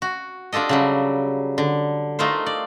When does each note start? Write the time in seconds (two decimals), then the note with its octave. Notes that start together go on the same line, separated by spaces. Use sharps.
0.02 F#4
0.52 D4 F4 G4 A4 D#5
0.69 C#3 F#3 G3
1.58 D3
2.19 A3 D#4 F4 A#4 C5
2.46 D5